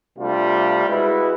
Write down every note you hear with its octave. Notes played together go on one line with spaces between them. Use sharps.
C3 G3 A3 D4 F4
G#3 E4 F#4 B4